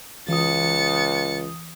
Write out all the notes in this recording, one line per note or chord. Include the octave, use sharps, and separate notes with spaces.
C#2 E3 D#6 A6 C#7